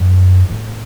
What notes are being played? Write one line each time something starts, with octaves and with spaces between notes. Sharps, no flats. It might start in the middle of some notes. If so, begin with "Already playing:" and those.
Already playing: F#2
A2